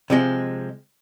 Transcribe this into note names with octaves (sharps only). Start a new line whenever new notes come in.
C3 F3 G#3